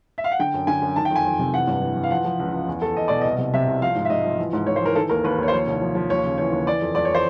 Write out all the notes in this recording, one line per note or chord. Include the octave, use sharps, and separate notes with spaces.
E5
F5
F#5
D3 G5
F#2
D3 G#5
F#2
D#3 A5
G5
F2
G#5
F2
C3
E3 F#5
G2
E3
E3
F5
F3 F#5
F3
C#2
C#2
E2
E2 A4
E2 D#5
B2 D5
C2 D#5
C3
C3 E5
C2
F3 F5
G#2
E5
G#2 D#5
F3
E3
G#2
G#2 C#5
C5
E3 A#4
D#3 A4
D#2 A#4
D#2 B4
D#2 C#5
C5
F3 C#5
C2
F3
F3
D#2 C#5
C#3
E3 C#5
D#2
E3 D5
F2
F2 D5
C#5
E3
C5